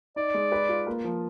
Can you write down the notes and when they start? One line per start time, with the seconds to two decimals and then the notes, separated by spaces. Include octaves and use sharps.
0.16 D#4 D5
0.34 G#3
0.52 B4
0.69 F4
0.87 A#3
1.04 F3